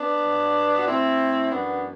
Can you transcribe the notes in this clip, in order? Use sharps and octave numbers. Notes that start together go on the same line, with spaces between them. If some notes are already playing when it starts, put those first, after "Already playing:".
Already playing: B3 D4
G2 F#3
F#4
A2 F#3 C4 E4
F#2 E3 G3 B3 D4